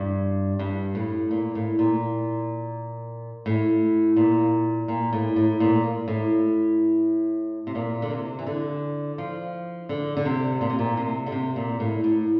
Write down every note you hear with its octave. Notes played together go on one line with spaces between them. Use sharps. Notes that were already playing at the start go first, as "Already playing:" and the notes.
Already playing: G2
G2
A2
A#2
A2
A#2
A2
A#2
A#2
A2
A2
A#2
A2
C3
A#2
D3
C3
E3
D3
F3
D3
D3
C3
A#2
C3
A#2
C3
D3
C3
A#2
A2
A2